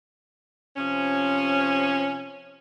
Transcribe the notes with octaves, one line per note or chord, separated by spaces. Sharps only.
C3 F3 C#4